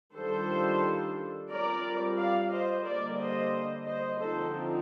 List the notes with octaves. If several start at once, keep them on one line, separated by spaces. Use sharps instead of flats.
D#3 G3 D4 F4 A4 C5
G3 C4 F4 A#4 D5
D5 F5
C5 D#5
D3 G3 A#3 A#4 D5
C5 D#5
C5 D#5
D3 F3 C4 D#4 A4 C5